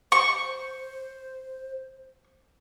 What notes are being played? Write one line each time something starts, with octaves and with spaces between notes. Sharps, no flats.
C5 C#6